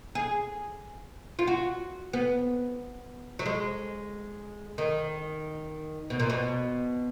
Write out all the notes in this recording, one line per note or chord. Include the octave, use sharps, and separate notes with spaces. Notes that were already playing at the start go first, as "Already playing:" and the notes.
G#4
F4
F#4
B3
F#3
G#3
D#3
B2
A#2
B2